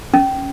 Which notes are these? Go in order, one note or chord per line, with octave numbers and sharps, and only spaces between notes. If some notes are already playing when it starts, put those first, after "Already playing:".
C#4